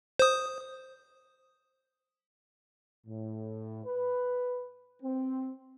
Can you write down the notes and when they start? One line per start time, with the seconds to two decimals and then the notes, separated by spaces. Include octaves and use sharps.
0.19 C5 D#6
3.06 A2
3.85 B4
5.02 C4